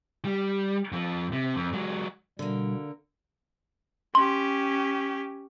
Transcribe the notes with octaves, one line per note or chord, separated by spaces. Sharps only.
G3
F2 F3
C3
F2
F#3 G#3
B2 D3 G3 A#3
C#4 G4 C6